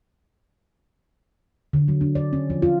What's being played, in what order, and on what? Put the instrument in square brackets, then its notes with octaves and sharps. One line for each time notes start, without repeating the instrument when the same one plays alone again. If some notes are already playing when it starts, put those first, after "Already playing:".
[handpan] D3
F#3
D4
D5
C#4
F3
F4